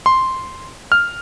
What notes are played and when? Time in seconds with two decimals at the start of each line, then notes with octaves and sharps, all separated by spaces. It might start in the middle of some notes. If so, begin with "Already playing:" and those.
0.06 C6
0.92 F6